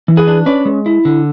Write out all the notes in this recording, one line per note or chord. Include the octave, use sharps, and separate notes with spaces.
E3
G#4 B4
D4
C#4 B4 D5
G#3
E4
D3